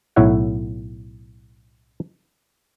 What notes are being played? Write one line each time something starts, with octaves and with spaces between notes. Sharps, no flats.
B1 A2 E4 C#5 E5 F#5